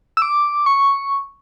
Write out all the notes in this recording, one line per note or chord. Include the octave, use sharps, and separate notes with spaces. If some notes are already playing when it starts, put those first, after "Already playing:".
E6
D6
C#6